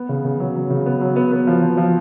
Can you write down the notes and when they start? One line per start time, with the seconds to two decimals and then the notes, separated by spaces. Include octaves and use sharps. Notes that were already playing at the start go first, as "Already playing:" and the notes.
Already playing: B3
0.09 C#3
0.24 C#3
0.40 F#3
0.56 F#3
0.70 C#3
0.86 B3
1.01 F#3
1.16 B3
1.32 B3
1.47 F3
1.62 F3
1.77 F3